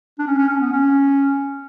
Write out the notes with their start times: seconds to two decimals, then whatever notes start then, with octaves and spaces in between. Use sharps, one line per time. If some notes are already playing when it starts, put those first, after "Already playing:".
0.19 D4
0.26 C#4
0.38 C#4
0.49 C#4
0.60 B3
0.72 C#4